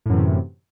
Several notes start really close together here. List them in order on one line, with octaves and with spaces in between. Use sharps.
A2 F#2 E3 C3